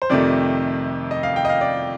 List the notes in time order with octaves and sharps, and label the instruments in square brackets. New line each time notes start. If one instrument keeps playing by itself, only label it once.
[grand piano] C5
F2 C3 D#3 A3 D5
D#5
F5
G5
D#5
F5
D5